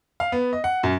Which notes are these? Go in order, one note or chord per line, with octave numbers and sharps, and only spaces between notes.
F5
B3
D#5
F#5
F#2